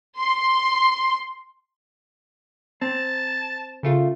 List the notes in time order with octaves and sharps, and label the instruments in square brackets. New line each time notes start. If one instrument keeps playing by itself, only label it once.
[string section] C6
[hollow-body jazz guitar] C4 [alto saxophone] A5
[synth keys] C#3 A3 F4